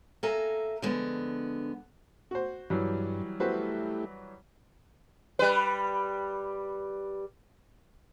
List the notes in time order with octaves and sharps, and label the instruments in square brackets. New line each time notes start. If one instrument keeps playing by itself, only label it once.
[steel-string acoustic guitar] A#3 A4 E5 G#5 A#5
D3 F3 G#3 B3
[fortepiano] F#4 C5
[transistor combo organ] G2 [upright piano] E3 F#3 G3
[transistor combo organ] A3 E4 G4 [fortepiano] F#4 B4 C5
[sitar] G3 B4